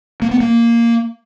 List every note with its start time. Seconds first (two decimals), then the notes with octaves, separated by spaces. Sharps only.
0.22 A#3
0.31 B3
0.40 A#3